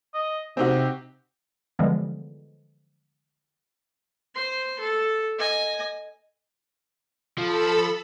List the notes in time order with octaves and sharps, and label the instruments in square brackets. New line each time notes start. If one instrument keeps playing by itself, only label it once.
[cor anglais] D#5
[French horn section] C3 [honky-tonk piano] C4 D#4 F#4 [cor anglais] G4
[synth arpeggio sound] D3 E3 F3 G3 G#3 B3
[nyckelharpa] C5 C6
A4
D#5 G#5
[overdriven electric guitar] F3 [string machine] A4 B5 E6